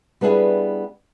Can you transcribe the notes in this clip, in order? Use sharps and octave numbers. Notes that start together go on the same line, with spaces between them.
G3 B3 D4 E4 G#4